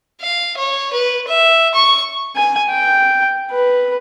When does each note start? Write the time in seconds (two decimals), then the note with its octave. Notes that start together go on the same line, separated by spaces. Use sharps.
0.22 F5
0.57 C#5
0.93 B4
1.28 E5
1.75 C#6
2.36 G#5
2.70 G5
3.51 B4